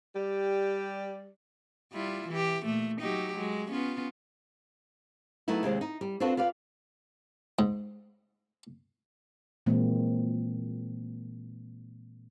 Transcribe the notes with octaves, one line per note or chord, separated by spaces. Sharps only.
G3 G4 D5
G3 E4 F4
E3 G4
A#2 A3
F#3 D#4 G4
F#3 G#3
B3 C#4 F4
F#3 A3 B3 D#4 E4
D#2 C3 G#3 C4
D#4
G3
C4 D4 F4 F#4 A4 B4
F4 B4 D5 F5
G#2
A#2 E3 G#3 A#3 C4